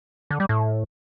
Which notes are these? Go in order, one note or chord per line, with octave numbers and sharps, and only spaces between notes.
D3
G3
A2